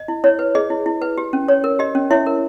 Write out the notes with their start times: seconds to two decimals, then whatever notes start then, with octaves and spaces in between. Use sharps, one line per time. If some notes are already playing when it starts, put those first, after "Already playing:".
Already playing: D#5
0.08 E4
0.24 E4 C#5
0.39 B4
0.55 G#4 D#5
0.70 E4
0.86 E4
1.02 B4
1.18 G4
1.33 C#4
1.48 C#5
1.64 A#4
1.79 G4 D#5
1.95 C#4
2.11 E4 C#5 E5
2.26 A#4